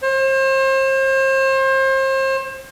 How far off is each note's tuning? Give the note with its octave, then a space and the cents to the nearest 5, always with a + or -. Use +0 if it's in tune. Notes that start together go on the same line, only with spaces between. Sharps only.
C5 +35